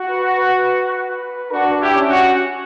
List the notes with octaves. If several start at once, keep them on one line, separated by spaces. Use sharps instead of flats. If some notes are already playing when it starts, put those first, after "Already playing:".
Already playing: F#4
B4
B4
D4 F#4
E4 G4
C#4
F#4